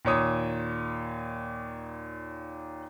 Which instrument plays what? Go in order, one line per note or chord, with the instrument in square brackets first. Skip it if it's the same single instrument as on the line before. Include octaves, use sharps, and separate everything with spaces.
[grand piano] D#2 A#2 C#5 D#6